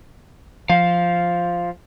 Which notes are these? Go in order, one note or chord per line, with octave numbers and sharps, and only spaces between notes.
F3 F5